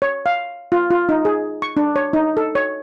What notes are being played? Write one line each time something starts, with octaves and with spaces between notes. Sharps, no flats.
C#5
F5
F4
F4
D#4
G#4
C#6
D4
C#5
D#4
A4
C#5